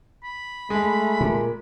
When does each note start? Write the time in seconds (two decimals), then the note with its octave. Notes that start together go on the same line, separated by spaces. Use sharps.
0.24 B5
0.70 G#3 A3
1.21 A#2